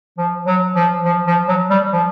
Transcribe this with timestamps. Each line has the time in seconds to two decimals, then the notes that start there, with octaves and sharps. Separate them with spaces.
0.18 F3
0.47 F#3
0.76 F3
1.05 F3
1.27 F3
1.48 F#3
1.70 G3
1.93 F3